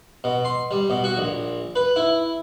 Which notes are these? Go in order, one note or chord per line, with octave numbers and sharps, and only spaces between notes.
B2
C6
G3
B2
F#4
A#1
B4
E4